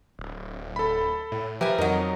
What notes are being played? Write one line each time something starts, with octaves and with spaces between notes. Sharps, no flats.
D1
A4 B5
A2
F3 G4 A#4 B4 E5 G#5
F2 F#3 D#4 A#4 D#5